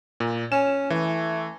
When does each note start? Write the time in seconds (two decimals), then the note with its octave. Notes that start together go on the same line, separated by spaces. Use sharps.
0.20 A#2
0.52 C#4 E7
0.90 E3 A3